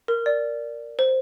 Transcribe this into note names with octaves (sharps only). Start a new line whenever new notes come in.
A#4
D5
C5